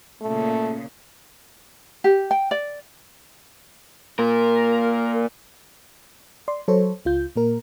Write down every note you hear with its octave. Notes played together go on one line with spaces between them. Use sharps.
A#2 C#3 A3
G4
G5
D5
A#2 A#4
D5 C6
F#3 A4 C5 C#5
C#2 F4 G6
A#2 A#3 A#4